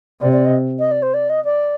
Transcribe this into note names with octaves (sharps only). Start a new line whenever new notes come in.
C3 D5
D5
D#5
D#5
D5
C5
D5
D#5
D5